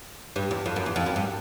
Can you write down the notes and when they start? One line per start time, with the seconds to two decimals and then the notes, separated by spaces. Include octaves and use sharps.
0.36 G2
0.51 E2
0.66 F2
0.76 F#2
0.86 E2
0.96 F2
1.06 F#2
1.16 G2